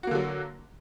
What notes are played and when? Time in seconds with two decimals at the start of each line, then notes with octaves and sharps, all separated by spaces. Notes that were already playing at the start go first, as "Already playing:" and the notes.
0.03 F#4
0.07 A#3
0.11 D3
0.15 F#3